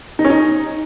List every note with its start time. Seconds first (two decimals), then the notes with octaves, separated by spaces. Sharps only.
0.19 D#4
0.25 C#4
0.30 D#4